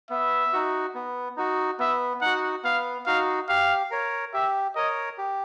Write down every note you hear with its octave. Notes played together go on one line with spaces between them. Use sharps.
B3 E5
D#4 F#4
B3
D#4 F#4
B3 E5
D#4 F#4 F#5
B3 F5
D#4 F#4 F5
G4 F5
A#4 C#5
G4 E5
A#4 C#5 D#5
G4